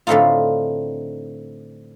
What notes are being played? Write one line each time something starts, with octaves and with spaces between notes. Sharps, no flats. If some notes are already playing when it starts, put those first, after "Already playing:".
A2 D3 A3 C4 D#4 F4